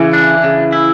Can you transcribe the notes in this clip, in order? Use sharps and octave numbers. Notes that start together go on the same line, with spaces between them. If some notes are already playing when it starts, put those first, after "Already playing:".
Already playing: C#3 E3
D4
C#3
E4